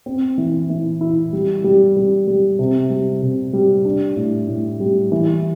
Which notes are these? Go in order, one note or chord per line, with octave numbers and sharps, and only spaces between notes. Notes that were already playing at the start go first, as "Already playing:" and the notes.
C4
E3
E3
E4
G3
G3
G3
G3
C3
G3
C3
G3
D4
A2
A2
G3
E3